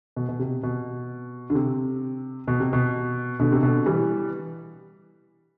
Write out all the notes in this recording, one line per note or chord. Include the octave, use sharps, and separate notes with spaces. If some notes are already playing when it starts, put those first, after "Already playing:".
B2
B2
C3
B2
D3
C3
B2
C3
B2
B2 D3
C3
B2 D3
E3 G3